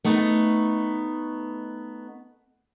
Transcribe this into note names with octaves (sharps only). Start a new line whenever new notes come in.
A3 B3 D#4